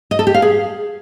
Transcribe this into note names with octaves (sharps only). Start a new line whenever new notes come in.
D#5
A4
G4
F5
G#4